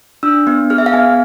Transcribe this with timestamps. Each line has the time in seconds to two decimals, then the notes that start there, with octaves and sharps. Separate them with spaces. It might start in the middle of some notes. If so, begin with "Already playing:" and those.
0.23 D4 E6
0.47 B3
0.70 G#4 F6
0.78 E5
0.86 F5
0.94 B3 G#5